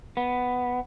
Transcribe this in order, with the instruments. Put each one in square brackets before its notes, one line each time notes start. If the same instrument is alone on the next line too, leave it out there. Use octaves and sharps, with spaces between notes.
[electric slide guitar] B3